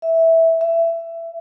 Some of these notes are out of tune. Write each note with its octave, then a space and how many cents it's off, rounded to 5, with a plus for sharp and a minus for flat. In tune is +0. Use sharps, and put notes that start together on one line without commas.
E5 -10
E5 +20